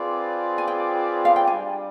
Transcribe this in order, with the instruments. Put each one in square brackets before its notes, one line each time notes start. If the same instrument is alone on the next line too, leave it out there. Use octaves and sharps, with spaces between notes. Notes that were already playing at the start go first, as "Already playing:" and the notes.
Already playing: [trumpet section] C4 F4 G#4 B4 D5
[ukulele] G#5
G5
F5
G5
[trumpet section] G3 D4 G4 D5 [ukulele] G#5